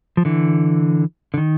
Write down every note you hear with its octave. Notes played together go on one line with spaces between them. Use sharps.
F3
D3 E3
D3
D#3